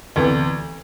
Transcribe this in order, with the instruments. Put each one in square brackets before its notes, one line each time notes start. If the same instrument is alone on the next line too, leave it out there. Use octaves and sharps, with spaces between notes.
[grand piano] D2 C3 E3 B3